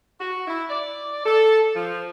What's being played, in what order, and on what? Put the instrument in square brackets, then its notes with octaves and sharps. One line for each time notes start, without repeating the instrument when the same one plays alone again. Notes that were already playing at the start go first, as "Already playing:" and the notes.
[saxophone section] F#4
E4
D5
A4
F3